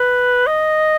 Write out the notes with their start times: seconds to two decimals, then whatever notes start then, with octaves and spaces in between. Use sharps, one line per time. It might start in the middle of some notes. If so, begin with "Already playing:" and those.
Already playing: B4
0.47 D#5